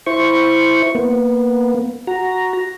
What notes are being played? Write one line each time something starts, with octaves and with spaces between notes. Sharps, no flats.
E4 C5 C#6
A#3 B3
F#4 A#5